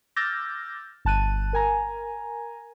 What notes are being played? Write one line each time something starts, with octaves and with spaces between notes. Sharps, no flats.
D6 E6 F6 G6 A6 A#6
G1 A5 F#6 D#7
A#4 G#5 A#5